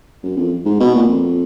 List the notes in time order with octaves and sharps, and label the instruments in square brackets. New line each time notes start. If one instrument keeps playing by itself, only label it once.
[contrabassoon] F#2
F2
G#2
B2
A#2
F2